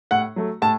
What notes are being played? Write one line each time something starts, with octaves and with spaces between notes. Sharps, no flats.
A2 F#5
F#3 A3
A2 A5